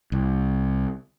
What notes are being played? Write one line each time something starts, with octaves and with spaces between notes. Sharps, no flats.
C2